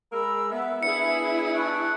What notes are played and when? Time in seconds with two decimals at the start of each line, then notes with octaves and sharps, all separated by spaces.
0.13 G#3 A#4 B5 E6
0.51 B3 E5
0.83 B3 D4 E4 G#4 C#7
1.54 A5 C#6 F#6